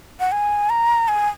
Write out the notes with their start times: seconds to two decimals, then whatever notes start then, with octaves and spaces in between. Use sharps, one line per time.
0.20 F#5
0.32 G#5
0.70 A#5
1.08 G#5